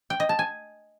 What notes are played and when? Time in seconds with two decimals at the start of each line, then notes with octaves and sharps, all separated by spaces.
0.10 G5
0.20 D#5
0.29 A5
0.39 G#5